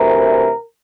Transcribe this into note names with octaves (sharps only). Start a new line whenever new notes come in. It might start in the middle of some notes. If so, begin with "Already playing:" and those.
Already playing: D2 C3 E3 A#4